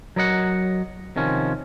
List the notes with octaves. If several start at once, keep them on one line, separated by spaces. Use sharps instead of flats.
F#3 A#4 D#5 F#5
C3 D#3 F3 C#4